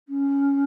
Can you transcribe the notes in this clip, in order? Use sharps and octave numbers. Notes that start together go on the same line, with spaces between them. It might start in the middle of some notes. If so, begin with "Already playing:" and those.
C#4